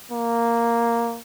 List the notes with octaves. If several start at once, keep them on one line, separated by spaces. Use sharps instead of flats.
A#3